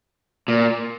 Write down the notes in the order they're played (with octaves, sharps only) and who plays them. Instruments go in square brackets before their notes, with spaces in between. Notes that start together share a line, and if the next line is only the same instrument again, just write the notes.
[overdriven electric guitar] A#2